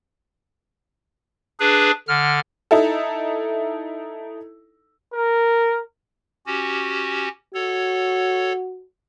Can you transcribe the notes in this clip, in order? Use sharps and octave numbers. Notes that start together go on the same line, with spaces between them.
D4 G#4 B4
D3 F6
D#4 E4 A4
A#4
C#4 F#4 G4
F#4 A4 C#5